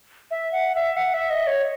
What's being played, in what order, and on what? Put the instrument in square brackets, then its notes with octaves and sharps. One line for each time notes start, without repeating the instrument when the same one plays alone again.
[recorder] E5
F#5
E5
F#5
E5
D#5
C#5